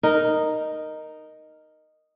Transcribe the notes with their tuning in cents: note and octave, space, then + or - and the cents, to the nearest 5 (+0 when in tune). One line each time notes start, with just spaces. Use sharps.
D#4 -5 A#4 +0